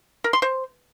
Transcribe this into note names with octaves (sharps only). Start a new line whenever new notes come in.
A#4
C6
C5